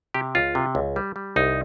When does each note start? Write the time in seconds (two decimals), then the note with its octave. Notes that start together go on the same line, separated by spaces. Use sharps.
0.14 C3 G4
0.35 C#2 F4
0.55 C3
0.75 C#2
0.96 G3
1.16 G3
1.36 C2 D#4